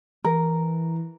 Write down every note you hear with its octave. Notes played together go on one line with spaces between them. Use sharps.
E3 A#4